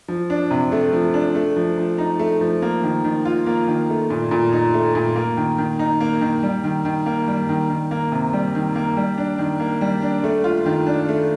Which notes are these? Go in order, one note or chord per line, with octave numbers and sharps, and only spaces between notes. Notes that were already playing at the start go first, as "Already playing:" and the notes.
F3
D4
C3
A3
F3
D4
A3
F3
F3
D#4
A3
F3
A#3
D#3
D#3
F4
A#3
D#3
A3
A#2
A#2
D#4
A3
A#2
A#3
D#3
D#3
D#4
A#3
D#3
G3
D#3
D#3
A#3
G3
D#3
D#3
A#3
C3
G3
D#3
A#3
G3
D4
D#3
A#3
G3
D4
A3
F4
D#3
D4
A3